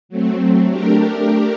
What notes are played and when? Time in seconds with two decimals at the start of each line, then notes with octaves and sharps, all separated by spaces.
0.09 F#3 A3 C4
0.68 A3 D4 G4 A#4